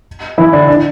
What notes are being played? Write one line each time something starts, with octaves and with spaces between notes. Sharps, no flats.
E3 E4
D3 D4
D3 D4